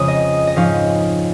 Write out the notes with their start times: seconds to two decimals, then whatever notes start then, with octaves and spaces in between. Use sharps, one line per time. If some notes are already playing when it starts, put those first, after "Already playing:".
Already playing: F2 C#3 G#3 C#4 D#6
0.08 D#5
0.47 D#5
0.56 G#2 F3 C#4 F5